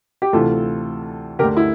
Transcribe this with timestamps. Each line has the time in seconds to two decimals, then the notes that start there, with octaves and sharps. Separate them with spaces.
0.22 G4
0.33 D2 C3 E3 F4 A4
1.39 D3 G4 A#4
1.44 D2
1.57 E4